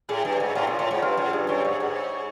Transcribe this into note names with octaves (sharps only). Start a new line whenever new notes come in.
A2 G#4
G2
C#5
G#2
A2 F4
A#2
A2 C#5
G#2
G2 F4
F#2
G#4
G2
G2 C#5
G#2
G#4
G#2
C#5